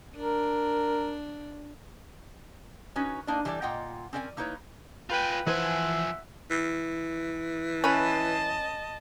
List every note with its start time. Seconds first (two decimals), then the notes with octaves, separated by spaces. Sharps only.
0.16 D4 A#4
2.96 C#4 D#4 F#4 B4 C#5
3.27 A#3 D4 D#4 A#4 D5
3.45 E3 G3 A4 C5 D5
3.62 A#2 F4 D#5 F#5 G5 A#5
4.13 C4 C#4 A#4 D5 F#5 G#5
4.37 A#3 D#4 E4 B4 C#5
5.10 F4 B4 G5 G#5
5.47 E3 F3 B4 C5 E5 F#5 G#5
6.51 E3
7.84 C#4 E4 B4 D#5 A5